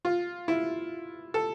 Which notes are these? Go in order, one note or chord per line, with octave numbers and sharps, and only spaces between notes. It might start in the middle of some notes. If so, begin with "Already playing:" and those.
F4
E4
A4